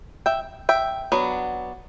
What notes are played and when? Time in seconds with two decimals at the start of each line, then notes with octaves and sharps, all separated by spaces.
0.26 E5 G5
0.69 E5 G5
1.12 F#3 B3 D4